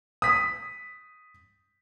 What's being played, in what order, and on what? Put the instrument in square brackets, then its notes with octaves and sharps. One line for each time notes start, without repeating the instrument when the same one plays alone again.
[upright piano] D#6 B6